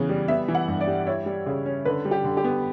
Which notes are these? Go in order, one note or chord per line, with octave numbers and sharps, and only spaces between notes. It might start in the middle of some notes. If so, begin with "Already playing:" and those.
Already playing: C#3 E3 B3
G3
B3 E5
E3
F#5
G2
D5
G3
E4 C#5
G3
C#3
C#4
D3 B4
G3
G4
D3
G4
B3